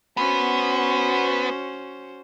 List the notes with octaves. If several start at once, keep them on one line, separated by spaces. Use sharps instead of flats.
B3 C#4 F#4 C5